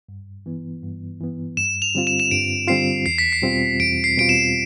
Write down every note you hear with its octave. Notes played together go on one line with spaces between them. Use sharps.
G2
E3 B3
G2
E3 B3
G2 E7
F7
D3 G3 C4 F4
E7
E7
G2 D7
D3 G3 C4 F4 C7
E2 C7
B6
C7
B2 G3 C4 F4
E2 D7
C7
B2 G3 C4 F4 D7
E7